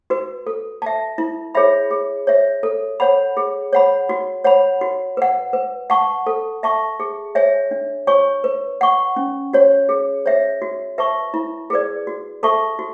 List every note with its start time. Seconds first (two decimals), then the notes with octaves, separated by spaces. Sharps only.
0.10 F#4 B4
0.47 A4
0.82 E5 A5
1.18 E4
1.55 G#4 C#5 E5 B5
1.91 G#4
2.27 C#5 E5
2.63 A4
3.00 C#5 F#5 B5
3.37 G#4
3.73 C#5 F#5 B5
4.09 F#4
4.44 C#5 F#5 B5
4.81 F#4
5.17 B4 F#5
5.53 B4
5.90 F#5 A5 C#6
6.27 A4
6.63 E5 A5 C#6
7.00 G#4
7.35 C#5 E5 G#5
7.71 D4
8.07 F#4 C#5 G#5 C#6
8.44 B4
8.81 F#5 C#6
9.16 C#4
9.53 F#4 C#5
9.89 G#4
10.26 C#5 E5
10.62 F#4
10.98 B4 E5 A5 C#6
11.34 E4
11.70 G#4 B4 D5
12.07 F#4
12.43 A4 E5 A5 C#6
12.79 F#4